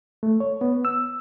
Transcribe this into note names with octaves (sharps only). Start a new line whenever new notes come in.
A3
C#5
B3
E6